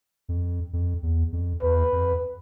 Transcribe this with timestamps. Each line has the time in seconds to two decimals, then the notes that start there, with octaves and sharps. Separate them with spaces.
0.29 F2
0.73 F2
1.03 E2
1.32 F2
1.62 E2 B4
1.92 F2